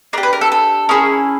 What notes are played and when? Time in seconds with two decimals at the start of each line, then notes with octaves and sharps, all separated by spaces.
0.13 D4 A#4
0.18 G4
0.23 B4
0.33 A#4
0.41 A4
0.52 A4
0.89 C#4 E4 G#4 A#4